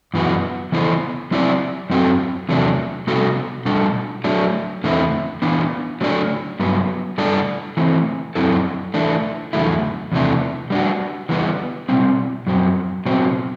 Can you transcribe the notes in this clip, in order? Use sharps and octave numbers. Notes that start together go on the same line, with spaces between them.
F#2 E3 B3 F#4
E3 B3 E4 A4 C5
F#3 C4 E4 G4 D5
F#2 F#3 C4 F#4 A4
E2 C3 F#3 A3 D4
C3 G3 B3 F#4 A4
B2 G3 D4 A4
F#3 A3 D4
E2 D3 A3 C4 E4
E3 B3 D4
F#3 A3 D4 A4 D5
G2 F#3 B3
A2 G3 D4 A4 D5
E3 A3 C4
F#2 F#3 C4 E4 A4
E3 A3 D4
E2 D3 F#3 A3 E4
E2 C3 E3 A3 D4
G3 D4 F#4
E3 G3 B3
B2 G3 C4
F#2 F#3 C4
B2 F#3 C4